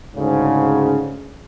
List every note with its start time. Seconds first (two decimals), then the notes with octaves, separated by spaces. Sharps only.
0.16 D2 G#2 C#3